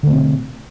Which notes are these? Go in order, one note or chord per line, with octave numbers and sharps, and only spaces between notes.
B2 D3 A3 C4